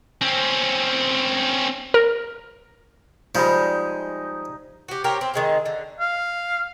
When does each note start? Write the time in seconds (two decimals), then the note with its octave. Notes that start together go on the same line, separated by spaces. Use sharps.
0.21 C4 C#4
1.94 A#4
3.35 F3 G3 G#3 D#4 G#5
4.88 F#4 G4
5.04 C4 G4 A#4 C#5
5.21 C4
5.34 D#3 G#3 C4
5.66 D3
6.00 F5